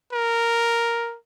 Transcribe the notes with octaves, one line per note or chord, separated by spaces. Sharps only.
A#4